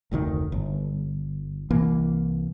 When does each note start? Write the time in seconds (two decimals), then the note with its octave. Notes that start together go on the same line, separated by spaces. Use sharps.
0.12 F1 D2 B2 D#3
0.52 G1
1.71 C2 E3 A#3